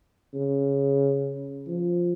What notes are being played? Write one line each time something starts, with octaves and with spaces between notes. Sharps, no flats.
C#3
F3